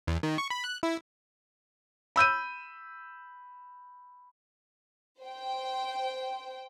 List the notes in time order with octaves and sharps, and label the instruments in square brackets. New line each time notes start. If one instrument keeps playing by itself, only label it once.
[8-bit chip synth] E2
D#3
C#6
B5
F#6
E4
[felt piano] B5 E6 G6 D#7
[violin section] C5 G5